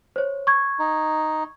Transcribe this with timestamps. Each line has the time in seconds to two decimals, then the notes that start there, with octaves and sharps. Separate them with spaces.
0.16 C5 C#5
0.47 C#6 G#6
0.79 D#4